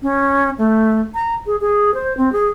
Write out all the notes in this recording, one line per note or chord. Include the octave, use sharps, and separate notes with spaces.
C#4
A3
A#5
G#4
G#4
C5
C4
G#4